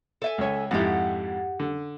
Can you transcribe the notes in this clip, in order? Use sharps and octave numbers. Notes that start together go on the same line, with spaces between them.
A4 E5 G#5
C#2 C#5
F2 G#2 E4 G4 F#5
D3